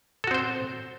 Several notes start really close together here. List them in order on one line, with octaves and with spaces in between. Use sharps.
A4 F#4 C4 C5